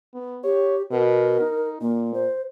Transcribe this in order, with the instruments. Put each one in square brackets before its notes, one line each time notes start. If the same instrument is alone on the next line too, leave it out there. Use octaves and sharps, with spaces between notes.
[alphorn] B3
[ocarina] G4 [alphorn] C#5
[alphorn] B2 [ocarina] A#4
[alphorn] D#4
[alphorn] A#2 [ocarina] A#3
[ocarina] C5